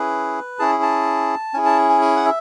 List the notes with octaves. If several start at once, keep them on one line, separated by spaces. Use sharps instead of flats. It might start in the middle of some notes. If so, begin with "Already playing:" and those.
Already playing: C#4 E4 G#4 B4
C#4 E4 G#4 A5
A5
C#4 E4 G#4 G#5
A5
G#5
G#5
F#5
E5